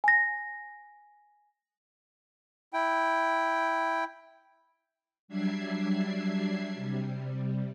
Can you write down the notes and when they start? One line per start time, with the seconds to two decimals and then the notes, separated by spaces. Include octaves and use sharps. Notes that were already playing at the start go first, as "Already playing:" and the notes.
0.04 G#5 A#6
2.73 E4 G5
5.28 F#3 G3 D4 E5 G#6 C7
6.75 C3 G3